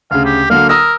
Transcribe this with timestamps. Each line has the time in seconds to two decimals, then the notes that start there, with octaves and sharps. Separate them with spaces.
0.11 D2 C#3 F5
0.25 G4
0.50 D3 F#3 A#3 F5
0.69 A#4 D#6 E6 A#6